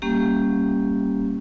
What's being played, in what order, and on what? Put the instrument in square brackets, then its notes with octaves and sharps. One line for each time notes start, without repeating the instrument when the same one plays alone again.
[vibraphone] G3 A#3 C#4 G4